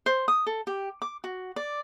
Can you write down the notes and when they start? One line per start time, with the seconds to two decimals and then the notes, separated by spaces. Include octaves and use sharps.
0.06 C5
0.28 D#6
0.46 A4
0.67 G4
1.02 D6
1.24 F#4
1.56 D5